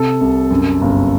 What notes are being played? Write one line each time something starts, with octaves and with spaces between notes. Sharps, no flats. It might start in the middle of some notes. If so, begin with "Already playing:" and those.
Already playing: C3 A4
C2
F#2
G1